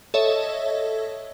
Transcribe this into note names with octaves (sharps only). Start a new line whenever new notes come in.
A4 C#5 D#5 E5